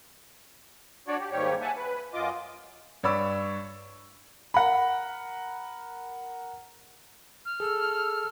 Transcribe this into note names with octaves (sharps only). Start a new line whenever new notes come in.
D4 F#4 C#5 D5
G4
D#2 G#2 G3 G4 C#5
E5 F#5 G#5 A5
B4
F#2 F4 D#5 D6
G2 C#5 D5 B5 E6
A#4 F#5 A#5 B5
F6
G#4 A4 E6